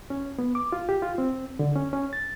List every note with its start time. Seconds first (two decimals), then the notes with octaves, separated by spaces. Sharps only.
0.10 C#4
0.39 B3
0.55 D6
0.72 F4
0.89 G4
1.02 F4
1.18 C4
1.59 D3
1.75 C#4
1.93 C#4
2.13 A6